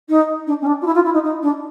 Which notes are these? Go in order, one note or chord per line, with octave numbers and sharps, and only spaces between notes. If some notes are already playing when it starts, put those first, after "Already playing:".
D#4
D4
C#4
D4
F4
E4
F4
E4
D#4
D#4
D4